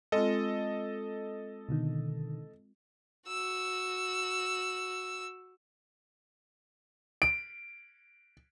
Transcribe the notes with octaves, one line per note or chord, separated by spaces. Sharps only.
G#3 C4 F4 A4 D#5
B2 D3 D#3
F#4 E6
D7